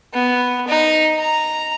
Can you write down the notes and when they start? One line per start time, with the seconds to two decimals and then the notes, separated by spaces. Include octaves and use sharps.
0.13 B3
0.68 D#4
1.19 A#5